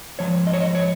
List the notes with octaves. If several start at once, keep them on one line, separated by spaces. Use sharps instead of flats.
G#2 F3 C#5
D#5
C#5
D#5
C#5